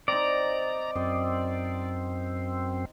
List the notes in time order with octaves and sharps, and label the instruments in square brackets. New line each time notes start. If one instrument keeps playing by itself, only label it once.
[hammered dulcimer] C4 D#4 [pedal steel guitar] D5 [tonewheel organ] A#5
[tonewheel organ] F#2 C4 [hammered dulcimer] D#5